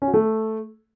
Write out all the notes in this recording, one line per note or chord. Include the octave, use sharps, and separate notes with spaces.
C#4
F#4
A3